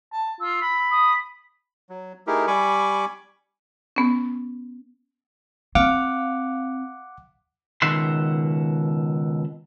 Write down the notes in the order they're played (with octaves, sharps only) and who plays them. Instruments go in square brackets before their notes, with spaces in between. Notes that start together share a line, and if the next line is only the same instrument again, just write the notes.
[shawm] A5
[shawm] F4 [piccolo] E6
[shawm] B5
[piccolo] D#6
[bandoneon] F#3
A3 D#4 E4 G4 G#4 A#4
G3 G#5 B5 C#6 D6
[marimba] B3 C#4
[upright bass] C4 [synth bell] F5 [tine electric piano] F#5 D6
[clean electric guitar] C#2 B2 D#3 E5 F#5 C6